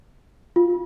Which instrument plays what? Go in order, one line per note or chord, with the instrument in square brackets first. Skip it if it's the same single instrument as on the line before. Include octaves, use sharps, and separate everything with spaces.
[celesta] F4